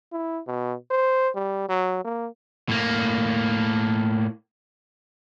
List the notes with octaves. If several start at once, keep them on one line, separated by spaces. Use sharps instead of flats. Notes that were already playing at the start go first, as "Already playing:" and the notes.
E4
B2
C5
G3
F#3
A#3
A2 A#3